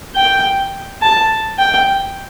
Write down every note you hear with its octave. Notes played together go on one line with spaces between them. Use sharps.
G5
A5
G5